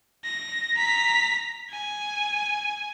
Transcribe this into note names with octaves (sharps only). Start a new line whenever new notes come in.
A#6
A#5 B6
G#5